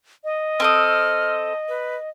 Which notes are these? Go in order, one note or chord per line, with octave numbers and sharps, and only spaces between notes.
D#5
C4 A4 D#6 F6
B4